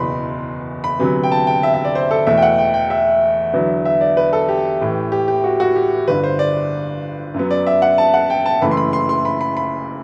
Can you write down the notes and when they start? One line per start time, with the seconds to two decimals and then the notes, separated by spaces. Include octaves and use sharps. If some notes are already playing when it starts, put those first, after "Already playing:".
Already playing: F#1 E2 B2 B5 C6
0.84 B5
0.99 D2 C3 F#3 B3
1.24 G5
1.32 A5
1.47 G5
1.63 E5
1.74 E5
1.85 D5
1.95 C5
2.11 A4
2.27 E2 B2 A3 E5
2.37 G5
2.42 F#5
2.58 G5
2.74 G5
2.90 E5
3.54 E2 D3 F#3 B3
3.85 E5
4.01 D5
4.17 B4
4.33 A4
4.49 G4
4.81 A1 A2 E3
5.12 G4
5.28 G4
5.44 F#4
5.60 F#4
5.76 G4
6.08 G1 G2 D3 B4
6.24 C5
6.39 D5
7.34 F#2 F#3 B3
7.51 D5
7.67 E5
7.82 F#5
7.98 A5
8.14 F#5
8.30 G5
8.46 A5
8.61 F#1 F#2 E3 A3 B5
8.71 C6
8.77 B5
8.93 C6
9.09 C6
9.25 B5
9.41 B5
9.57 B5